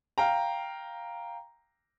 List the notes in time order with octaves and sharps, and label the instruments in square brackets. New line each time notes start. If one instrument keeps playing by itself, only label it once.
[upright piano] F5 G5 A#5